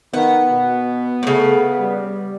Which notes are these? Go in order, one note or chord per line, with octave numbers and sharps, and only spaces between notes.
D#3 B3 F#5
B2
A2 C#3 A3
G3